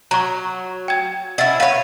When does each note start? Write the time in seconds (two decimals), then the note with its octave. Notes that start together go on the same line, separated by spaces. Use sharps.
0.11 F#3 A#5 C#6
0.88 G5 G#6
1.38 C#4 E4 D#5 F#5 A6
1.60 B4 C#5 F5 F#5